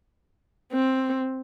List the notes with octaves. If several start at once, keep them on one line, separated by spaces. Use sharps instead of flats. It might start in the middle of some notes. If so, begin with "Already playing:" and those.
C4